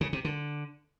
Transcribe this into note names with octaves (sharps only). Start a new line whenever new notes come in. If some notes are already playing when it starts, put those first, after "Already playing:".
C#3
C3
D3